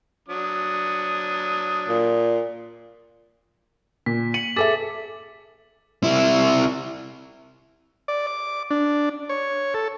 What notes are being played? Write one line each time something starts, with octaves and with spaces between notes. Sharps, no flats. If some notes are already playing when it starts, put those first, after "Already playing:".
F#3 D4 D#6
A#2
A#2 B6
C#7 D#7 F#7
G#4 A4 E5 D6 A6 B6
C3 E4
D5
D6
D4
C#5
A4